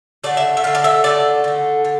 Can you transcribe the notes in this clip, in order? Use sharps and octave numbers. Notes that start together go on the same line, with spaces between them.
D3 A3 D5
E5
E5
D3 A3 F5
D5
E5
D3 A3 D5
D3 A3
D3